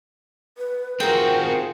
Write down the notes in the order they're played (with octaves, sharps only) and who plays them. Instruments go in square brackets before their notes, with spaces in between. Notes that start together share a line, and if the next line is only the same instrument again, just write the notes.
[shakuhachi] B4
[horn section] D#3 F4 G#4 [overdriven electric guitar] C4 F#4 [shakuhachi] A#4 [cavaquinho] G5 A#5